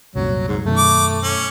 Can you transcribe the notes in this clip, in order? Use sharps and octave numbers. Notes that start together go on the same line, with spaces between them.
C2 F#2 A#2 F#3
G#2
F#2 B2 D#3 A3
D6
C#4